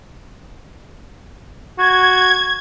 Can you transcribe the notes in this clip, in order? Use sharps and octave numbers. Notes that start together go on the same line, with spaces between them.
F#4 G#6